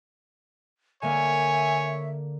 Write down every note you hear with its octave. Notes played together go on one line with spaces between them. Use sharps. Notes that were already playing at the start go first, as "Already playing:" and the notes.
D3 A#3 C#5 E5 G#5